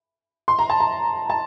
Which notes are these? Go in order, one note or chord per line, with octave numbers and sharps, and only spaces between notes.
C6
A#5
A5
A#5
A5